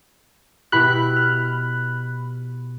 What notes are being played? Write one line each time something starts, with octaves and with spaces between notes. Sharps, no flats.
B2 E4 G4 B5 F#6
F6